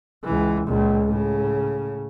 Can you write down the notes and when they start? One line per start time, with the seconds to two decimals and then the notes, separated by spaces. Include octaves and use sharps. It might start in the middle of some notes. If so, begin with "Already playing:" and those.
0.24 C#2 E3
0.67 C#2 A#2
1.05 A2 C#3